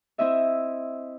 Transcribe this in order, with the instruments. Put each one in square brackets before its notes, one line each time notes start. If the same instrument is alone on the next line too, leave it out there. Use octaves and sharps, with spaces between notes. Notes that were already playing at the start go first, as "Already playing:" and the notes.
[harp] C4 E4 D#5 E5